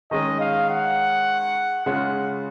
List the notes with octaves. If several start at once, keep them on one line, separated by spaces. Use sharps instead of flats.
D#3 G#3 C#4 D#5
F5
F#5
C#3 G#3 C#4 F4 F#5